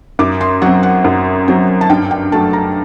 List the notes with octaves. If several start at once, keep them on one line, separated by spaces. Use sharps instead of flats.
F#2 D6
C6
F#3 C4 F#5
F#5
F#2
F#3 C4
A5
G2 G5
G5
F#3 A3 A5
A#5